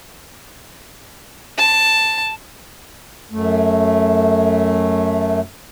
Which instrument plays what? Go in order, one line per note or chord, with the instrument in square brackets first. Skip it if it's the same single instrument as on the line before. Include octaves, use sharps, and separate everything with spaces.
[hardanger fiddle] A5
[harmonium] F#2 A3